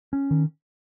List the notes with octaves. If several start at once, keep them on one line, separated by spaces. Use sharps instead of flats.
C#4
D#3